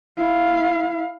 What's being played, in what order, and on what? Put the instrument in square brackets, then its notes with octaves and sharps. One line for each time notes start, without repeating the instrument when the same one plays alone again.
[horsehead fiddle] E4 F5